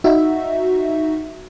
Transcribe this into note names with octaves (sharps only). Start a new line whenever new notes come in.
D#4 F#4 E5